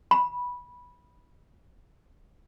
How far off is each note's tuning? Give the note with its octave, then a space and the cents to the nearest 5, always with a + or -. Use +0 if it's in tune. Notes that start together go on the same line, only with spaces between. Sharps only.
B5 -10